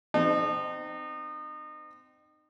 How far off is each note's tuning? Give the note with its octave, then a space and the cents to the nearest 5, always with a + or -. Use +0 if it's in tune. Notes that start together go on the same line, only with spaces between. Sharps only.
C4 -25 D#4 -30 A5 +0